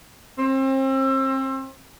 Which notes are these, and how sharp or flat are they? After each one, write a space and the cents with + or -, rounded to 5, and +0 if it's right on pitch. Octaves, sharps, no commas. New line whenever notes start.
C4 +35